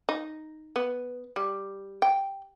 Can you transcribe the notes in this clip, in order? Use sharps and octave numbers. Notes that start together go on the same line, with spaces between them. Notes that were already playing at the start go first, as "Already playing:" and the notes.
D#4
B3
G3
G5